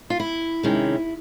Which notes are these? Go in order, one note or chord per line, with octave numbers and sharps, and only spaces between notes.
F4
E4
C3 D#3 G#3 C#4